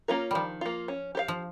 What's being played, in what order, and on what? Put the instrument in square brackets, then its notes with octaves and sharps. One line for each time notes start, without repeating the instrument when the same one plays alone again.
[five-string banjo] A#3 C#4 F4 A#4
[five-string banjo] D#3 [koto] F3 G3
[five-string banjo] A#3 F4
C#4
G4 C5 F5
[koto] F3